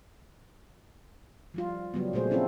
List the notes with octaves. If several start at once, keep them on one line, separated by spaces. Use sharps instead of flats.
F3 G3 F4
C#3 F#3 G3 B3
A#2 G3 A3 G#4 C5
F3 C4 C#4 E4 F4 A4